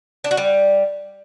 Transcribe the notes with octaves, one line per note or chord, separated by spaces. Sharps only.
D4
F#4
G3